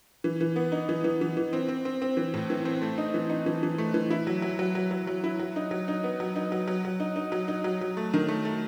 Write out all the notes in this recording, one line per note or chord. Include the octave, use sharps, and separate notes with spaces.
E3
E3
B3
D#4
E3
E3
E3
E3
C4
C4
C4
C4
E3
A2
E3
C4
A3
D#4
E3
D#4
E3
E3
A3
E3
E4
F#3
F#3
F#3
F#3
F#3
F#3
E4
F#3
D#4
F#3
D#4
B3
F#3
D#4
F#3
F#3
F#3
D#4
D#4
F#3
D#4
F#3
F#3
A3
D#3
A3
A3